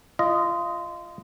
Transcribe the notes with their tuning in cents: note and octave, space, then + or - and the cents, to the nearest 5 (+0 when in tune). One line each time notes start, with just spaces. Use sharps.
F4 -25 D#5 +0